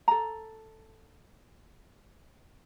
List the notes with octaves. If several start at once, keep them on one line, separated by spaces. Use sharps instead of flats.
A4 A#5